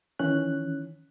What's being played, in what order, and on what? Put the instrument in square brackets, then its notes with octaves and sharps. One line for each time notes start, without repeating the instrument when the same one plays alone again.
[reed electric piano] D#3 E3 C#4 F#6